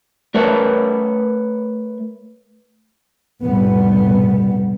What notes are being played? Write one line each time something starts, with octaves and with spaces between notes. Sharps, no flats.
A3 A#4 B4 C#5 E5 A5
F1 B1 A2 G3 B3